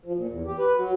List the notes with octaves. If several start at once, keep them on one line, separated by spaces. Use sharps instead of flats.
F3
A#2
E2
G4
B4
F#3